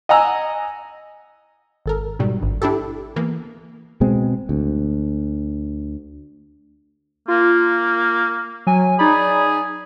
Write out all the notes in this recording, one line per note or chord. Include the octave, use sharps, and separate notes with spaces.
D#5 F#5 G#5 A#5 E6
G#1 A4 A#4
G#2 B2 F#3 G3
G#1 G2
D4 E4 G4 A4
E3 A#3 B3
B2 G#3 C4
D2
A#3 F4
F#3 G#5
D#4 G#4 D5 B5